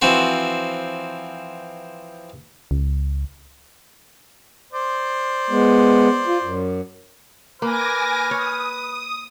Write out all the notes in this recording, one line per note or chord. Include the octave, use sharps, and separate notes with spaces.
E3 F3 C4 F#4 C5
C#2
C5 D5
G#3 B3
F4
F#2
A#3 B4 G#5 D6 F6 A#6
C#5 D#6